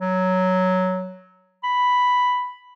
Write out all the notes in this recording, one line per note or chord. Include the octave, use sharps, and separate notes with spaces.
F#3
B5